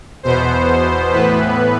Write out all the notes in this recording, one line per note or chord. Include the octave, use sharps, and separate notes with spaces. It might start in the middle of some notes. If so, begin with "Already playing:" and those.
E2 B2 B3 C5
A2 E3 B3 B4